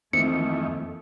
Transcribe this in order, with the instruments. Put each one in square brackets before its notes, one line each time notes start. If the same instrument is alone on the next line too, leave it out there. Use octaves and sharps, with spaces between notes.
[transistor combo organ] F2 D#3 E3 [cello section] A3 [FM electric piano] A#3 C4 [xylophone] C#7